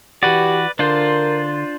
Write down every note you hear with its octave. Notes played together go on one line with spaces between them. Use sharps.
E3 F#4 G4 B4 D5
D3 D4 F4 A#4 C5